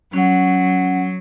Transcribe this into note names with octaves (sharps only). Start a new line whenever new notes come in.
F#3 C#4 F#5